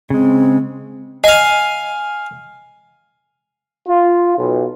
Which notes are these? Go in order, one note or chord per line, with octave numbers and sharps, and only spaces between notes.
C#3 G#3 C4
D#5 F5 G#5
F4
B1